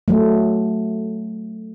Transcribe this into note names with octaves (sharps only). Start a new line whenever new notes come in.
F#3 A3